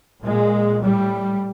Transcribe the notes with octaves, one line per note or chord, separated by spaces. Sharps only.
A#2 G#3
A2 G3